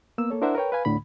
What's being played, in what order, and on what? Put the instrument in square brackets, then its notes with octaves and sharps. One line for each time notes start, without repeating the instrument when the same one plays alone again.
[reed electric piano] A#3 B3 E6
A#3 A4 C#5
D4 E4 A#4 C5 E5 F#5
A#4 B4 C#5 G5
B4 F5 G#5 B5
D2 A2 D3 B5